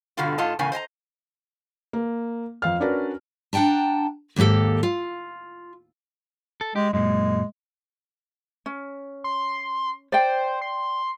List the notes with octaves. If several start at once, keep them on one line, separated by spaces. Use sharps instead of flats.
G2 B2 D3 G3 F4 F#4
G#2 F4 A4 D#5 A5
E2 A2 C#3 A3 A#3 G#5
C5 D#5 G#5 A#5
A#3
F2 F5 F6
C#4 D4 F#4 A#4 B4 D5
D4 F#5 G5 A5 A#5
D#2 G#2 A#3 G4 A4
F4
A4
G#3 G4
F#2 A#2 G#3
C#4
C6
C5 D5 G5
C6